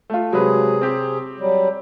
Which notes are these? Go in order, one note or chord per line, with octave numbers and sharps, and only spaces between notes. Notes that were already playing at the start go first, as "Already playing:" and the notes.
A3 F4
C3 F#3 G#3 G#4 B4
C4 G4
F#3 G3